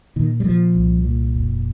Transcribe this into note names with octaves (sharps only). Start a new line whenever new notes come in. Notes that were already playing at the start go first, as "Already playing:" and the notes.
A#2 D#3
G3
A#2 F3
C2
A#2
F1